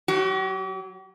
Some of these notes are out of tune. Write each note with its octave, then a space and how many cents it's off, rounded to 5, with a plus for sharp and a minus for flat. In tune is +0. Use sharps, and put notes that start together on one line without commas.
F#3 +0 G4 -45